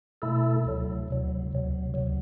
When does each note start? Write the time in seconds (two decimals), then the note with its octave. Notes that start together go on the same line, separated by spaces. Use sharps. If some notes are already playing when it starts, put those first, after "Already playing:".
0.22 B2 A3 E4 A4
0.65 D2 C3 F#3
1.08 D2 C3 F#3
1.51 D2 C3 F#3
1.94 D2 C3 F#3